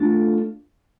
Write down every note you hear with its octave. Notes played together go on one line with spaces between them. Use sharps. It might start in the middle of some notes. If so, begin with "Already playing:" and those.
Already playing: A3 D4 F4 A4